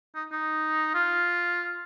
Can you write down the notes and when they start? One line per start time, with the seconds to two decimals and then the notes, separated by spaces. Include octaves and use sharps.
0.15 D#4
0.32 D#4
0.94 F4